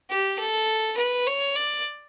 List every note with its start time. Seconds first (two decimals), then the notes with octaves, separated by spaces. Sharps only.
0.10 G4
0.39 A4
0.97 B4
1.27 C#5
1.56 D5